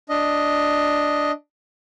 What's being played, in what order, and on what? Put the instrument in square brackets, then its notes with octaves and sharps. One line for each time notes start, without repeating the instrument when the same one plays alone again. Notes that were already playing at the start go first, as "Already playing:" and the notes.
[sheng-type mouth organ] D4 D#5